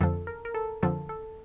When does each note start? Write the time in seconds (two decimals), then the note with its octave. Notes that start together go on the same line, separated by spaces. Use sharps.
0.01 F2 D3 F3 A4
0.27 A#4
0.45 A#4
0.54 A4
0.83 F2 D3 F3 A4
1.09 A4